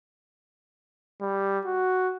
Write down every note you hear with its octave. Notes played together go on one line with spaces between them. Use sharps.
G3
F#4